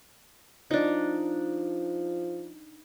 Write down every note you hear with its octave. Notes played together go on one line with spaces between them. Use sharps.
F3 D4 D#4